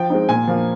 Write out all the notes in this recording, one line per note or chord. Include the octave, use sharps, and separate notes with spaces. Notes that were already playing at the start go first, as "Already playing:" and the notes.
Already playing: F3 G5
G#3 C4 D#4
A#2 G#5
F3 A#3